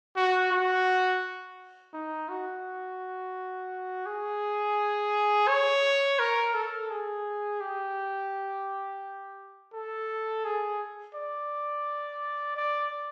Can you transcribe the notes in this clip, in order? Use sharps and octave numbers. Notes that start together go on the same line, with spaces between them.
F#4
F#4
D#4
F#4
G#4
C#5
A#4
A4
G#4
G4
A4
G#4
D5
D5